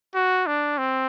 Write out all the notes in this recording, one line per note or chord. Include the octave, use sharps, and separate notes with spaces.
F#4
D4
C4